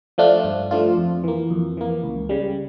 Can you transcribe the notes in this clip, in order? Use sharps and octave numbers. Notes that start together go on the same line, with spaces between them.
F3 A3 D4 F4
G2
F3 A3 D4 F4
F2
E3 A#3
F2
E3 A#3
C#2
C#3 G3